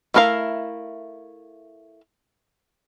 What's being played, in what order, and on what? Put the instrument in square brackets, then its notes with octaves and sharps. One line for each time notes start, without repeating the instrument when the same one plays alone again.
[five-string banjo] A3 E4 A#4 C5 F5